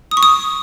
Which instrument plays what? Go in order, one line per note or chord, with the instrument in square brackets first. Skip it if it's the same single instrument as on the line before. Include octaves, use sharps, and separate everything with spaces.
[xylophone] D#6
C#6
D#6